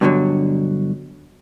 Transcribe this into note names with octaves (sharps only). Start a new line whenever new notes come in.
G2 B2 D3 E3 F#3